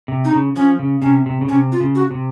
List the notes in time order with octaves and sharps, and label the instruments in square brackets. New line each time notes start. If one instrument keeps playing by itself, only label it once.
[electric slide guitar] C3
[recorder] D#4
[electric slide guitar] C#3
[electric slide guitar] F3 [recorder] C#4
[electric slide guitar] C#3
[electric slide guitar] C3 [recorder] C#4
[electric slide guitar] C3
C#3
[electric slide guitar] C3 [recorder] C#4
[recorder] F4
[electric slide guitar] C#3
[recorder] F#4
[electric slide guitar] C3